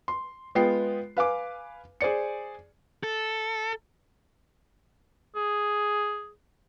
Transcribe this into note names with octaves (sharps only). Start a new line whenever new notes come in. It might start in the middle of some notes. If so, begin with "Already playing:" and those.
C6
G#3 B3 F4 G5 C7
B4 F5 G#5 D6
G#4 C5 D5 C#7
A4
G#4